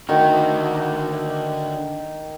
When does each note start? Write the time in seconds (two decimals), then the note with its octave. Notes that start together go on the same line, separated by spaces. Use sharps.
0.09 D3 D#3 F#4